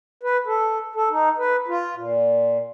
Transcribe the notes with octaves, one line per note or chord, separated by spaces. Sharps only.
B4
A4
A4
D#4
B4
F4
A#2